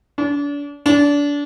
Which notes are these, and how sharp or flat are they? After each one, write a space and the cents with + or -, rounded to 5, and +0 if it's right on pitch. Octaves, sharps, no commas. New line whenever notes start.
D4 -35
D4 -25